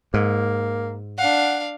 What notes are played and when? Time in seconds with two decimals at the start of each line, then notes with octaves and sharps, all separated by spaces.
0.14 G#2 A#3
1.18 D4 F5 F#5